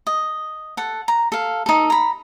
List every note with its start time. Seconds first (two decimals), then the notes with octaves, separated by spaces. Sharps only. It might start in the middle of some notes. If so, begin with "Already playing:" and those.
0.07 D#5
0.77 A4 F#5
1.08 A#5
1.32 A4 F5
1.66 D#4 A4
1.90 A#5 B5